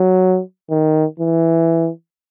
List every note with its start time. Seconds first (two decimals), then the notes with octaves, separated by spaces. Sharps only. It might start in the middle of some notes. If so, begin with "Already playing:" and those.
Already playing: F#3
0.70 D#3
1.20 E3